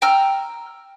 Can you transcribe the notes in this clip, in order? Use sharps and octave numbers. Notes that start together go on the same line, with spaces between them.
G5 A#5 E6 F6